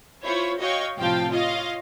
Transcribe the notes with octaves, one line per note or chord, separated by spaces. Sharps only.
E4 F4 C5 C#5
F#4 C#5 D#5 F5 G5 C#6
A2 C3 F3 F5 G5 A5
F4 C#5 D#5 F5